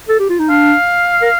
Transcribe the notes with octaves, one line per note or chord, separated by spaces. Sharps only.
A4
G4
F4
D#4
D4 F5
A#4